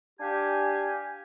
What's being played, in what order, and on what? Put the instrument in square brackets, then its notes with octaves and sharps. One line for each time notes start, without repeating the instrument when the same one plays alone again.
[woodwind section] D4 G4 F5 G5 G#5